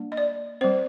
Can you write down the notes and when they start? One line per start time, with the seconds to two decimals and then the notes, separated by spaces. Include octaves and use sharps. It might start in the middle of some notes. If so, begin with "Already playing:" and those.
Already playing: G3 A#3 D4
0.12 D#5
0.17 D5
0.61 G3 C4 C5